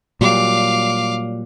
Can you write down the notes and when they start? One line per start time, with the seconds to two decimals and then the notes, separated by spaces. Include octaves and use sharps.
0.21 A#2 F#3 G3 F5 D6